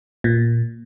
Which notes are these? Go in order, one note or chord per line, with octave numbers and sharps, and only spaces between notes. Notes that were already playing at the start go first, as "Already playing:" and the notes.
A#2